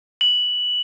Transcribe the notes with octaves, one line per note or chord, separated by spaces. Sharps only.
F#7